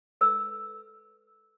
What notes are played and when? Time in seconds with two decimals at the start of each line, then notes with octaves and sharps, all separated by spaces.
0.21 A4 B4 E6